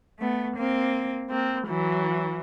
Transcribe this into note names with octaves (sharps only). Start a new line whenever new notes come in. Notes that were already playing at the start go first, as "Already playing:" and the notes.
A3 B3
A#3 C4
A#3 C4
E3 F#3